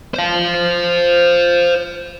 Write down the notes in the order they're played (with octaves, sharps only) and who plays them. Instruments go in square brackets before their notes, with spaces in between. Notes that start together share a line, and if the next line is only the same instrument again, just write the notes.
[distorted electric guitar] C5 F5